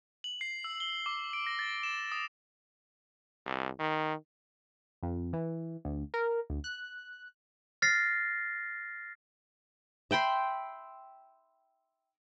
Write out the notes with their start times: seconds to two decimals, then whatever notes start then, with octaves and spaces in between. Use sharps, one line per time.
0.24 F#7
0.41 C7
0.64 E6
0.80 G7
1.06 D6
1.33 D7
1.47 A#6
1.59 A6
1.83 E7
2.12 D#6
3.46 C2
3.79 D#3
5.03 F2
5.33 E3
5.85 D2
6.14 A#4
6.50 D2
6.64 F#6
7.82 F6 A6 A#6 C7
10.11 E5 G5 B5 C6